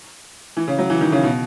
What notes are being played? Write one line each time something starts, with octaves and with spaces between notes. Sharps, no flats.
E3
C#3
F#3
E3
D#3
C#3
B2